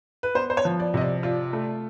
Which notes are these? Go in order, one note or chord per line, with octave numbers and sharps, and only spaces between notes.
B4
B3 C5
C5
C#5
F3
D5
C3 D#5
D5
F4 D5
A3